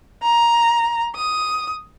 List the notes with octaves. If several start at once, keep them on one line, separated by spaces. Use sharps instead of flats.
A#5
D#6